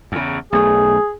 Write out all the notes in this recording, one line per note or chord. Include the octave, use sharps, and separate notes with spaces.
E2 C#3
B1 A3 G#4